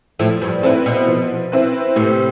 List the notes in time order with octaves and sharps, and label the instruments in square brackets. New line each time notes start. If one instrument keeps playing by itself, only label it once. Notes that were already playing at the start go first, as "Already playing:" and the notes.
[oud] A2 [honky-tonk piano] F3
[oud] G2
[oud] A2 [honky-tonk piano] C4 E4 B4
[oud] B2
[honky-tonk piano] F3
C4 E4 B4
[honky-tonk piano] A2 [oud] C3